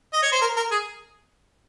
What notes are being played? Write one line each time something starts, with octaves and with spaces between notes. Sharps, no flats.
D#5
C#5
C5
A#4
A#4
G#4